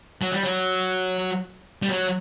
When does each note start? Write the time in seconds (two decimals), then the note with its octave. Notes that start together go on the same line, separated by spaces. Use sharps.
0.22 F#3
0.32 G3
0.43 F#3
1.82 G3
1.89 F#3